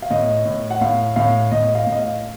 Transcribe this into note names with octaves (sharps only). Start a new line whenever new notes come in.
F5
A2 D#5
A2
F#5
A2 F5
A2 F5
A2 D#5
F5
A2
D#5
F5